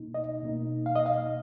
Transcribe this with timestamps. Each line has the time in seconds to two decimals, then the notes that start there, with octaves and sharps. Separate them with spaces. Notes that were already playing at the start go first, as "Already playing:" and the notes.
Already playing: B2 A#3 D#4
0.14 D#5
0.43 B2 A#3 D#4
0.86 F5
0.96 D#5
1.06 F5